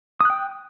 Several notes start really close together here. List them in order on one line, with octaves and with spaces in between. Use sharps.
D#6 F#6 G5